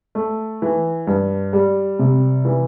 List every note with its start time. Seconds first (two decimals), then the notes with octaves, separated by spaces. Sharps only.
0.15 A3
0.62 E3
1.07 G2
1.53 G3
1.99 C3
2.45 E3